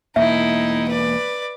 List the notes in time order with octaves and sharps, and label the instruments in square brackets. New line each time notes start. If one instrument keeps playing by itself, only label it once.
[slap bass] E1 A#3 [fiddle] D#4 E4 [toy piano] E5
[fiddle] B4 D5